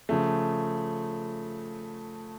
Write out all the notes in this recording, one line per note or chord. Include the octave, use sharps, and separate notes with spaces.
C#3 F3 A3